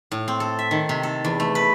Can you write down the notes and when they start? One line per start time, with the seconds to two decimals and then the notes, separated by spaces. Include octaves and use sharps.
0.12 A2
0.28 C4
0.40 A4
0.59 E5
0.71 D#3
0.89 C3
1.03 A4
1.25 E2
1.40 A3
1.55 B4